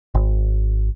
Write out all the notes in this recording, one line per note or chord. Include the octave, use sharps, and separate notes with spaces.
G#1